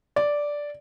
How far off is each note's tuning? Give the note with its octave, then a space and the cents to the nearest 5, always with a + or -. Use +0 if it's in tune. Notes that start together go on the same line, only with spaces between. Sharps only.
D5 -5